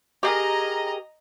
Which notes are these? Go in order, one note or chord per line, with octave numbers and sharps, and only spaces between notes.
G4 G#4 A#4 D#5 A#5